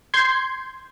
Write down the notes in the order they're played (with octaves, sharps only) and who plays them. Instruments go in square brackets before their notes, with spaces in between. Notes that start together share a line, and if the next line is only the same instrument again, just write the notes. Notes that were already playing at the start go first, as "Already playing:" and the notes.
[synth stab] C6 G6 G#6